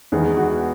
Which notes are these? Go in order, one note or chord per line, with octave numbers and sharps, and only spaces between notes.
E2 D#3 G#3 B3 G#4
F#4